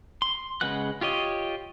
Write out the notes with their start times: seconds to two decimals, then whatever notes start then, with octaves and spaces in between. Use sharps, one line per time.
0.22 C6
0.61 C#3 G#3 B4 F#5 F#6
1.01 F4 G4 C#5 D#5